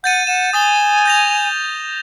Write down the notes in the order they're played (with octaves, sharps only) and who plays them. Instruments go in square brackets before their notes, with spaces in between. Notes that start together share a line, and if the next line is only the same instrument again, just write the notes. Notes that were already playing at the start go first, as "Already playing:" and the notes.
[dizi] F#5 [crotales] G6 A6 D#7
[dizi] F#5 [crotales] E7
[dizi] G#5 [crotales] D#6 A6 G7
[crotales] G6 A#6 F7